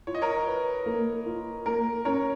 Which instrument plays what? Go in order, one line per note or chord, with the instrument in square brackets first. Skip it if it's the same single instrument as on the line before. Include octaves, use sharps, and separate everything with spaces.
[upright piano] F4 [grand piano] C#5
[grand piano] D#5
A#4 C#5
[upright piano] B4
A#3
F4
[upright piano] A#3 [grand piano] A#4
[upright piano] C#4 [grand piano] A#4 C#5